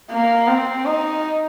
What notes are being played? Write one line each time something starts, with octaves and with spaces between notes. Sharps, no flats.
A#3
C4
D#4